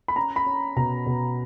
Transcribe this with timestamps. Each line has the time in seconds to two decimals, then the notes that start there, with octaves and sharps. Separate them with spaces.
0.08 B5
0.16 C#4 A#5
0.36 B5
0.46 C#4
0.76 B2 A#5
1.06 B2